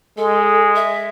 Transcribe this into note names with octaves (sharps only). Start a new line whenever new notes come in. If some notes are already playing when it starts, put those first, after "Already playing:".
G#3 A4
E5